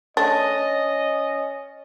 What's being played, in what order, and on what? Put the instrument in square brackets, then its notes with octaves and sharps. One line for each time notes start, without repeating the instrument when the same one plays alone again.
[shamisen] A3 D4 [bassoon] C#4 [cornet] D#5 [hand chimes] A6